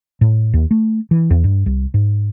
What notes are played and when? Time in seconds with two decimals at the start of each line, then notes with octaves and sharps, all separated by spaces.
0.21 A2
0.54 D#2
0.71 A3
1.11 E3
1.31 E2
1.44 G2
1.66 C2
1.94 G#2